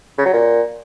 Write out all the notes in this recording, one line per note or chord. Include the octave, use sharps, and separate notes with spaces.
C#3
F#3
A#2